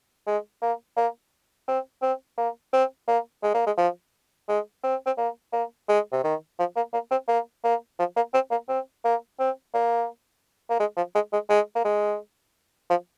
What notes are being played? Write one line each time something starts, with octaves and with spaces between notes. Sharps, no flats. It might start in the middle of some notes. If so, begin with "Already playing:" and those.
G#3
A#3
A#3
C4
C4
A#3
C4
A#3
G#3
A#3
G#3
F3
G#3
C4
C4
A#3
A#3
G#3
C3
D#3
F3
A#3
A#3
C4
A#3
A#3
F3
A#3
C4
A#3
C4
A#3
C4
A#3
A#3
G#3
F3
G#3
G#3
G#3
A#3
G#3
F3